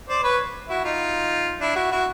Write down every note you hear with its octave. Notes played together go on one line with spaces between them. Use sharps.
C5 D5
B4 C#5
E4 F#4
D#4 F4
D4 E4
E4 F#4
E4 F#4